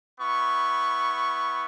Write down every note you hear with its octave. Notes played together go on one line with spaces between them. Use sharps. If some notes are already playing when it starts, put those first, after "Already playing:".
B3 E4 C#6